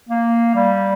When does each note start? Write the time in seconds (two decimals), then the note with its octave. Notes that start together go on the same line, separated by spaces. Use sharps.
0.09 A#3
0.55 G3